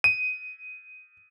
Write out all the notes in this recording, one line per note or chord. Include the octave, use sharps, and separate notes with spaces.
D#7